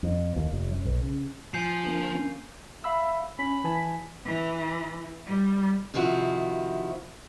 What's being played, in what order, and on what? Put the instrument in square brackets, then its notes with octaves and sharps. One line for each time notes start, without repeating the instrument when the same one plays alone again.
[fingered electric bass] F2
D#2
F1
F#2
B1
C#3
[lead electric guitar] F3 [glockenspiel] G#5 G6 C7
[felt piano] D3 A#3
A#3 C#4
[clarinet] E5 [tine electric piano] F5 B5 E6
[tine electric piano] C#4 [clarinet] B5
[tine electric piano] E3 G#5 A5
[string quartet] E3
G3
[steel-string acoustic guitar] C3 D#3 F3 E4 F#4